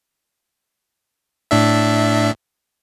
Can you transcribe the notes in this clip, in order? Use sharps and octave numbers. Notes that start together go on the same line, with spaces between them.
A2 D4 E5